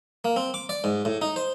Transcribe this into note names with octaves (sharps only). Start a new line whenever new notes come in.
A#3
C4
D6
D5
G#2
A2
D#4
C5